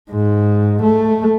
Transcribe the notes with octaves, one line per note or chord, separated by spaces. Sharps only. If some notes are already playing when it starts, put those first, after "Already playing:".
G#2
A3